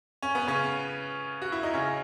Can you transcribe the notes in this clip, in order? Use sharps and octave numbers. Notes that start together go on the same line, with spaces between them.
C#4
B3
C#3 C#4
F#4
E4
D#4
C#3 C#4